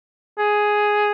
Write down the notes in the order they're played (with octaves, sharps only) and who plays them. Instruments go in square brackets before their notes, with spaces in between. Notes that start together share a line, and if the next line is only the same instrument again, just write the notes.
[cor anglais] G#4